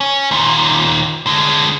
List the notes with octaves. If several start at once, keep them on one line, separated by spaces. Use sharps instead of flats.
C#4
D#2 A#2
D3 G#3